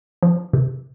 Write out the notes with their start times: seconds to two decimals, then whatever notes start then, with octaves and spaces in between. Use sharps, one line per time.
0.23 F3
0.53 C3